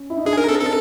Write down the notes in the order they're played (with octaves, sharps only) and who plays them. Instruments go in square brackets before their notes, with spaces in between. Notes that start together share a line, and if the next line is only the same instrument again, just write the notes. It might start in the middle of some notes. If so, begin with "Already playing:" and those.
Already playing: [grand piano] C#4
E4
D#4
[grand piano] D4 [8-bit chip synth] G#4
[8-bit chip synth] A#4
[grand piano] C4 [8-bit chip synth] A4
[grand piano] D4 [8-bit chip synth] A4